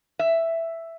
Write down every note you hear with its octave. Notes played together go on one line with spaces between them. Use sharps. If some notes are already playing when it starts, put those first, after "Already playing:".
E5